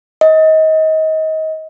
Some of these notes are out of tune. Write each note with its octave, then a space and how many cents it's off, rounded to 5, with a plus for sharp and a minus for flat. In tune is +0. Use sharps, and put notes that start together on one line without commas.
D#5 +25